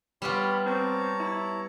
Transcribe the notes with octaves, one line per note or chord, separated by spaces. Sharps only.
G3 B3 F4 C#5 B5
C4 C#5 A5 A#5
E4